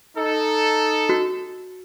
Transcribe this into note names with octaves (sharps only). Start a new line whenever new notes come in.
D#4 A4
F#4